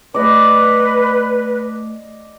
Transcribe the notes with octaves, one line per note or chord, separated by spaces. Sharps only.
A3 B4 D5 D#5